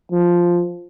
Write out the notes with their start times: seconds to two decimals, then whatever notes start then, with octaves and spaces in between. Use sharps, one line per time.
0.11 F3